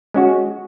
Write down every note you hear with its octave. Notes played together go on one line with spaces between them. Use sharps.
G#3 C#4 F#4